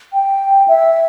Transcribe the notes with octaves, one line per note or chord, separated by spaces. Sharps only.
G5
E5